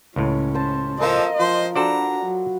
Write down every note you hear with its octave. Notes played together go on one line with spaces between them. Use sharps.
C#2 A2 C#4
C5 A5
F3 A4 A#4 C5 D#5 F5
F3 C5 C6
D4 F#4 A4 C5 D5 A#5 B5
F#3